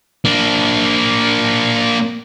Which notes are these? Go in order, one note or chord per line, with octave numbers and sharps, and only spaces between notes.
A#3 D4